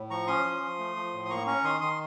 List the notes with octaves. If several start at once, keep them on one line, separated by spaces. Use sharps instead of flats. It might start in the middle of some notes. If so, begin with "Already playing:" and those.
Already playing: A2
F3 A#5 C#6
C#4 C6 D#6
F3
F3
A3
F3
A2
D#6
A#3 A#5 C#6
C#4 A#5 C#6
D#3 C6 D#6
D#3 C6 D#6